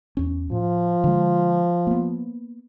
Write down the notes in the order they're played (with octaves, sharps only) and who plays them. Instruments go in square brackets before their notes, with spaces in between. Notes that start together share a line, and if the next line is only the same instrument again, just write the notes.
[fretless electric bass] E2 C#4
[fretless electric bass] A2 [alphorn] F3
[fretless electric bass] D3 G#3
A#3 B3